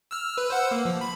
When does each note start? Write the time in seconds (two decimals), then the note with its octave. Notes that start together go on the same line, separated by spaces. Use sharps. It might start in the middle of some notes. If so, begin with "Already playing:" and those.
0.11 E6 F6
0.38 B4
0.50 C5 F#5 E6
0.71 A#3
0.85 F3
1.01 B5